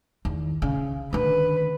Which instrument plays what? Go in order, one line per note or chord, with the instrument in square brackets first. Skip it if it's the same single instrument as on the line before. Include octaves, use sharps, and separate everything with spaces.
[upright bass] E2 D#3
C#3
[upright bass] D3 D#3 [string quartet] B4